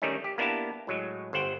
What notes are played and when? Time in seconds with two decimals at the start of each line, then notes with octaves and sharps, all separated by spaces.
0.02 D#3 G3 A3 C#4 D#4
0.24 G4
0.38 A#3 B3 D4 E4 G4 A5
0.87 A2 F#3 G#3
1.33 G1 C5 F#5 G5